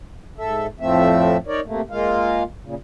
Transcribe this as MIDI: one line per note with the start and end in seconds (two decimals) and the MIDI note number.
0.38 0.67 44
0.38 0.67 69
0.38 0.67 76
0.80 1.37 41
0.80 1.37 45
0.80 1.37 53
0.80 1.37 57
0.80 1.37 60
0.80 1.37 76
1.47 1.61 63
1.47 1.61 70
1.47 1.61 73
1.47 1.61 74
1.66 1.81 48
1.66 1.81 57
1.66 1.81 58
1.91 2.43 56
1.91 2.43 58
1.91 2.43 65
1.91 2.43 77
2.63 2.75 46
2.63 2.75 49